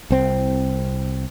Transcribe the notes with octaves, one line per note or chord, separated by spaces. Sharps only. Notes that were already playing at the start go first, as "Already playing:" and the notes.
C2 C4